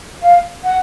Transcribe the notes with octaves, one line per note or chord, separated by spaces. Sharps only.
F5
F#5